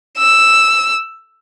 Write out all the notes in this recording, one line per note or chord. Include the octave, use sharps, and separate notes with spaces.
E6